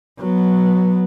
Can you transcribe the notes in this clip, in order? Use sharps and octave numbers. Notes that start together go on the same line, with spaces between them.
F#3 B3